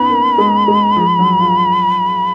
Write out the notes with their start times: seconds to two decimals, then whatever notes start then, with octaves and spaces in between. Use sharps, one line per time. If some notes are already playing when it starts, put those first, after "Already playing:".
Already playing: B3 C#4 D#4 B5
0.10 A#3
0.38 G#3
0.68 G#3
0.96 F3
1.19 F#3
1.40 F4